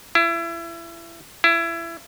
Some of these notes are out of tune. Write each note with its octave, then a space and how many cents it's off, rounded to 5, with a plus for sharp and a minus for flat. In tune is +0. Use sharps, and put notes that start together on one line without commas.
E4 +30
E4 +25